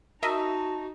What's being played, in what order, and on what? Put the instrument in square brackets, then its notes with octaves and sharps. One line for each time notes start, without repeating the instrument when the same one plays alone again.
[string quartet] D#4 [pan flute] F#4 [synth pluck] A#4 D#5 E5 [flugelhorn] A5